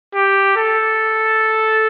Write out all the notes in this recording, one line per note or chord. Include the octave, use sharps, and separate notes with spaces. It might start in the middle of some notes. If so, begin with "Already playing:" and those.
G4
A4